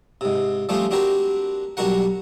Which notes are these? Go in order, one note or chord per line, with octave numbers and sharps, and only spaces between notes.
G#2 C3
F3 G3 A3 C4 C#4 G4
C4 D4 F#4 G4 A#4 B4
B1 G3 D4 F#4 A#4 F#5